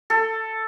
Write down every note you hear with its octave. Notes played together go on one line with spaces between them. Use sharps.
A4